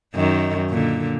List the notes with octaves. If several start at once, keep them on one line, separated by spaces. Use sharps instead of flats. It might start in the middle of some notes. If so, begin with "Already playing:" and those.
F#2 D#3 D#4
A#2 D3